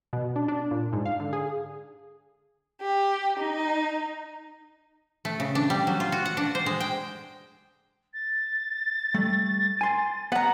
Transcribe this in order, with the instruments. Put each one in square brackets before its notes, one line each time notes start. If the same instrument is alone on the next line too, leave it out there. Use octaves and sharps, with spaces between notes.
[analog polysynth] B2
D4
D4
A#2
G#2
F5
D3
G#4
[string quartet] G4
D#4
[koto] A3
C#3
D4
G3
F#3
F4
F#4
F#5
D4
C5
G#3
G5
[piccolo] A6
[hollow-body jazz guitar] G3 A3
G#5 C6
[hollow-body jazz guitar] B3 [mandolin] F#5 A#5